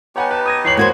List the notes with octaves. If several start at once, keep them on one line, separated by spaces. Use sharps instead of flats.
B3 D#4 G4 C#5 F#5 G#5
B4 A5
D#6 G#6 A#6 D#7
E2 C#5 C7 F#7
A#3 F#4 C5 G#6